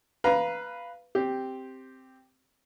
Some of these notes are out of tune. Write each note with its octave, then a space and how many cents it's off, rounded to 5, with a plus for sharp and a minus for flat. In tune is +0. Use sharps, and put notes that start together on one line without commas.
B4 +0 F5 -10 A#5 +25
C4 +0 G4 +0